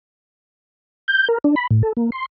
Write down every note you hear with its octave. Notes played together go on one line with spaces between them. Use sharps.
G6
A#4
D4
B5
A2
A4
A#3
C6